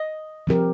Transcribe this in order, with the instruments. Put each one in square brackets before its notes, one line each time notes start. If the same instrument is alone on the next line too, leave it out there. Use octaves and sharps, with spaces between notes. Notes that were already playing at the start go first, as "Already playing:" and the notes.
Already playing: [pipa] D#5
[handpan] F3 C4 G4 A#4